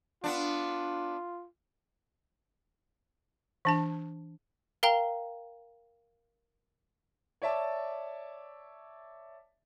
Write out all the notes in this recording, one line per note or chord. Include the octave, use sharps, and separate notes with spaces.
B3 D4 F4
E3 D4 A5
A#4 F5 G5 A#5 G7
C#5 D5 E5 A5 D6